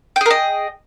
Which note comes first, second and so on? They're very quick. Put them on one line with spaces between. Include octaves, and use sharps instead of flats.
G5 G#4 A#4 D#5